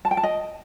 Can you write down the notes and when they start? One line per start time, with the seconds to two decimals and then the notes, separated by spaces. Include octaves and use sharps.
0.05 A5
0.11 G5
0.17 A5
0.23 D#5